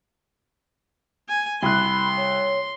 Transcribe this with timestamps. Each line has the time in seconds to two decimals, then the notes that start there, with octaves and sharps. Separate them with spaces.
1.29 G#5
1.62 C2 B5 C6 F#6
2.17 C#5